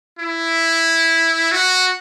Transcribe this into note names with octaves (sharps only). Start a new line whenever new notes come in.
E4
F#4